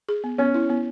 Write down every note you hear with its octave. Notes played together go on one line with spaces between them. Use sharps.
G#4
B3
B3 C#4
E4
B3